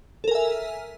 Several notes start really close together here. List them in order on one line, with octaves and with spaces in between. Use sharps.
A4 A#4 G#5 E5